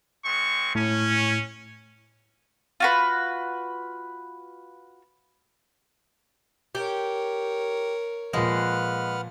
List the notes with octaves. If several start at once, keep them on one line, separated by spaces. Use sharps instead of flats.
G#3 C4 C#6
A2 C#4
F4 F#4 B4
G4 A#4 C#5
A#2 F3 G#3 B4 F#5 F6